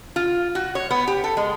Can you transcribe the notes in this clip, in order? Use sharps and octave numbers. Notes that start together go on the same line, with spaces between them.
F4
F#4
C#5
B3
G4
A4
G#3